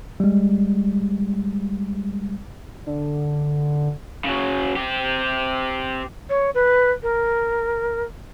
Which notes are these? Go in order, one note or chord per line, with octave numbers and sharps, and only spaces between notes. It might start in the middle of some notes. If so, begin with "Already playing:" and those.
G3 G#3
D3
C#3 F#3
C4 G4
C#5
B4
A#4